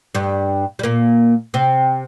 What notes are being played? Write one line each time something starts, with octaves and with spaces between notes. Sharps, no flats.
G2 G3
G3
A#2 A#3
C3 C4